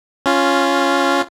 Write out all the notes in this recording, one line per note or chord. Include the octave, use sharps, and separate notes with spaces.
C#4 F4